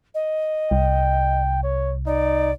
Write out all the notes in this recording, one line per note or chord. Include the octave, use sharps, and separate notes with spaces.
D#5
C2 G5
C#5
D#4 D5